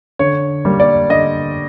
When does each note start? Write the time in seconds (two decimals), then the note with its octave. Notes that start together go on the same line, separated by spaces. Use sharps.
0.19 D3 C#5
0.65 G3 A#3
0.80 D5
1.09 D3 D#5